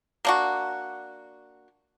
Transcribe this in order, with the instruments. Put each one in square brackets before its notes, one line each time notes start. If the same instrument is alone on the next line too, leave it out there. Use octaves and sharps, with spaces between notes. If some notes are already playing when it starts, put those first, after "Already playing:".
[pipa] A#3 D4 F#4